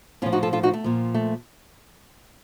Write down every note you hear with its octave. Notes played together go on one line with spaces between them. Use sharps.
A2 F3 C#4 F4
D#4 F#4
F4 A4
F4 A4
D#4 F#4
A3
A#2 F3
A3